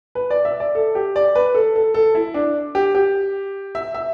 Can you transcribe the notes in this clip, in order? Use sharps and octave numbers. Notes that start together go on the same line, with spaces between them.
B4
D5
E5
D5
A4
G4
D5
B4
A4
A4
A4
E4
D4
G4
G4
E5
E5